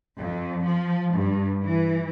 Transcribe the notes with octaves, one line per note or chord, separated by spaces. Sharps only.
F2
F3
G2
E3